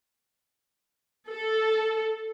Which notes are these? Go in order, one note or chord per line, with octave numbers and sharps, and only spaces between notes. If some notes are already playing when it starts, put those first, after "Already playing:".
A4